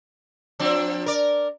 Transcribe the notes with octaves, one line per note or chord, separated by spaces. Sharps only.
F3 C4 D4
A#4 D5